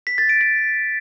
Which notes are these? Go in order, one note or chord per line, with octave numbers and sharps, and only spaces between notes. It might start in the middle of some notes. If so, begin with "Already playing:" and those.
B6
A6
D7
B6